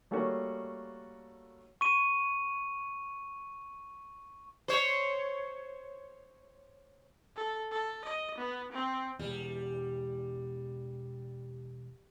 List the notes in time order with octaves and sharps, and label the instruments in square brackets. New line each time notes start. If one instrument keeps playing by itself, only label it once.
[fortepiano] G3 A3 A#3 C#4 F#4 C#5
[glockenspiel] C#6 D#7
[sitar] C5 C#5
[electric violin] A4
A4
D#5
B3
C4
[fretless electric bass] E1 E2 [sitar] G3